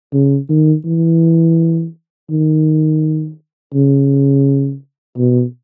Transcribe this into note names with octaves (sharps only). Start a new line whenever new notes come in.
C#3
D#3
E3
D#3
C#3
B2